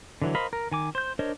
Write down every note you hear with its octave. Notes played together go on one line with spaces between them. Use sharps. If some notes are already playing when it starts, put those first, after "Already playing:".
D3 E3 F#3
A#4 C5 D#5 F5 B5
A#4
D#3 G#5 D6
C5 G6
D4 A#4 C5 C#5 D#5